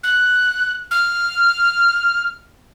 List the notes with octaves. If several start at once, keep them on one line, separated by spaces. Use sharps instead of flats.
F#6
F6